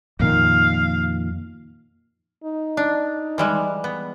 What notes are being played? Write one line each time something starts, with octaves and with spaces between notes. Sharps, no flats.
F2 A#2 D#3 F5
D#4
D4
E3 G3 G#3
B3